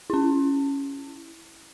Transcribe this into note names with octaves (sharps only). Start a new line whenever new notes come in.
C#4 E4